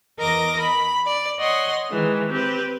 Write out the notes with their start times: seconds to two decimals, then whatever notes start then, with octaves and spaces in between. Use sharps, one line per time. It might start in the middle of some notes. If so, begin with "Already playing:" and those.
0.18 E2 A#4 D#5 D6 A#6
0.59 B5
1.06 D5
1.39 C#5 D#5 F#5 C6
1.91 D#3 E3 G#3
2.30 C4 G4 B4